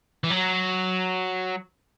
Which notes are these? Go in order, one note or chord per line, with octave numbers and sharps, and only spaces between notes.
E3
F#3